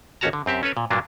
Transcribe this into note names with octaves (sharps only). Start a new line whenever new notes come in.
A1 D#2 C#4 F#4 A5 A#5
D3
F#2 C4 G4 E5
C#4 A4 B4 C#5
A#2
G2 A#2 F#3 A#3 D4